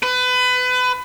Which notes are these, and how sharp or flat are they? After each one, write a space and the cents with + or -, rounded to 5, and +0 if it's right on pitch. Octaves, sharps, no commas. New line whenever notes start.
B4 +25